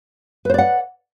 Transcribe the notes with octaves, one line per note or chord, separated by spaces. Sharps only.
B4 C5 D5 F#5